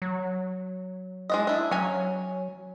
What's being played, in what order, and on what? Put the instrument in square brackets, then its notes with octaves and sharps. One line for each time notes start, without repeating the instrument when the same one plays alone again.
[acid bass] F#3
[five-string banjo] G#3 D4 D#5
D4 E4
[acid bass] F#3 [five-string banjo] C#4 G#5